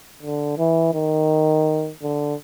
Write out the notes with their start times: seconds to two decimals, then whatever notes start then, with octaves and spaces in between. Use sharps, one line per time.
0.23 D3
0.58 E3
0.94 D#3
2.02 D3